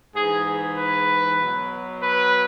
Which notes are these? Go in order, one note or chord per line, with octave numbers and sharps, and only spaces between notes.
G#2 G#4
E3
G#4
B4
B2 F#3
B4